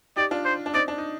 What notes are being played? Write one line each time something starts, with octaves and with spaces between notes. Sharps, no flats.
D#4 G4 D5
D4 F4
C5
D4
C4 D#4 D5
D4
D#4